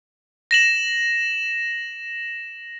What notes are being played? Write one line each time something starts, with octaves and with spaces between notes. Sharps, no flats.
A#6 E7 F#7